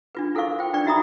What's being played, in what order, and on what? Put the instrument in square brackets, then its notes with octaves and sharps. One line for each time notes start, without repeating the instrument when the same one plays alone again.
[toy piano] D4 F4 B4
E4 A4 A#4 C5 F5 C#6
F4 C5 G5
D4 B4 D5 G5 C#6
D#4 F#4 E5 A#5 B5 D#6